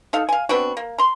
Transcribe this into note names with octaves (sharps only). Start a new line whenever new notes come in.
D#4 A4 F5
F5 G#5
B3 C4 D4 F#4
A#3
A#5 C6